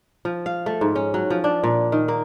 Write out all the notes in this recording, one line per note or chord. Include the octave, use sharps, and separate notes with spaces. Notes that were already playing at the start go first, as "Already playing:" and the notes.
F3
F5
A3
G#2
C#4
F#3
F3
D4
A#2
D#3
A#3